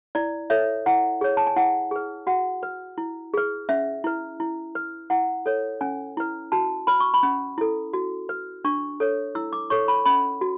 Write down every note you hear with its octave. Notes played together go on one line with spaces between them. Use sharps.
E4 D5
A4 C#5 E5
E4 F#5
G#4 C#5
A5
G#5
E4 F#5
G#4 B4
F#4 F#5
B4
E4
G#4 B4
C#4 E5
E4 B4
E4
B4
E4 F#5
A4 C#5
C#4 G#5
E4 B4
F#4 A5
B4 B5
C#6
B5
C#4
E4 A4
F#4
B4
D4 C#6
A4 C#5
E4 E6
D6
A4 C#5 C#6
B5
C#4 B5
F#4